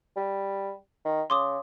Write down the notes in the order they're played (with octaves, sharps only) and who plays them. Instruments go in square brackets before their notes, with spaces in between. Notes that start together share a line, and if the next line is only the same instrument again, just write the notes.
[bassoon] G3
D#3
[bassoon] C#3 [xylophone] C6 D6 D#6